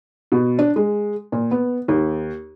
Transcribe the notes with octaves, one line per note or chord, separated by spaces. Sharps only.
B2
D4
G#3
A#2
B3
D#2